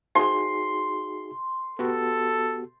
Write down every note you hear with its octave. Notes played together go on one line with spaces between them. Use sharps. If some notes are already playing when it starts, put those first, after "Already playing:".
D#4 F#4 G#4 C6
B3 F#4 G4 A4